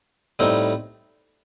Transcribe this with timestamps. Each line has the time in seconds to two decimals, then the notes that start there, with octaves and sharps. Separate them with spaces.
0.39 A2 G3 C4 D#4